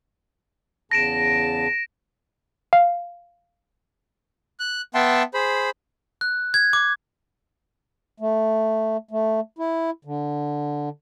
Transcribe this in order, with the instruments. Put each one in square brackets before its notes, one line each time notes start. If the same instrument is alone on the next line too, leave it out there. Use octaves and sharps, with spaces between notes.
[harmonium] E2 C#3 A5 [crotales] A#6 D7 E7
[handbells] F5
[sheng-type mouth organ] F#6
B3 E5 F#5 G5 A5 C6
G#4 C5 B5
[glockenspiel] F#6
G#6
D6
[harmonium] A3
A3
E4
D3